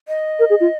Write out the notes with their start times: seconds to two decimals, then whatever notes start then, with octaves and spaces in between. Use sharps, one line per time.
0.08 D#5
0.39 A#4
0.50 G#4
0.61 F4